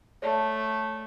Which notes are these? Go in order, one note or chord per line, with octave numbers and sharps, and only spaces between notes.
A3 C#5 D5 A5